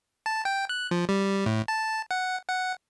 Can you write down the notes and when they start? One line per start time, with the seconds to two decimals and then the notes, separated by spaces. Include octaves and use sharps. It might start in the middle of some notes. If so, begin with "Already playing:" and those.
0.26 A5
0.45 G5
0.69 F#6
0.91 F3
1.09 G3
1.46 A2
1.68 A5
2.11 F#5
2.48 F#5